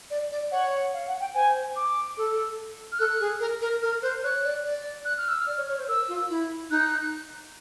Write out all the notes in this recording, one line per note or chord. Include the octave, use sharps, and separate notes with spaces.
D5
D5
C#5 F#5
F5
F#5
G5
C5 G#5
D6
A4
F6
A4 F#6
G#4
A#4
A#4
A#4 F6
C5 F#6
C#5 F#6
D5
D5
F#6
F6
E6
F6
D5
C#5
C#5
C5
A#4 E6
F4
E4
D#4 F#6